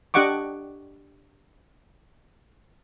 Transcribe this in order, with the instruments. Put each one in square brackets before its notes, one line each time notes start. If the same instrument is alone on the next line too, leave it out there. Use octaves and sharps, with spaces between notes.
[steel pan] D4 G4 D#5 F#5 C#6 D6